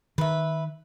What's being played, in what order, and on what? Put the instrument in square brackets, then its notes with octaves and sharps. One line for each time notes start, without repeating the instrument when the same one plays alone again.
[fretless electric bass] D#3 [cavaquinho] B4 E5